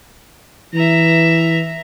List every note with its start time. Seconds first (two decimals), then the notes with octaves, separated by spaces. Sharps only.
0.74 E3 E5 A#5